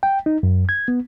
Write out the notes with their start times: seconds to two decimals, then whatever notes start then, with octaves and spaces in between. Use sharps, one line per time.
0.03 G5
0.26 D#4
0.43 F#2
0.69 G#6
0.88 B3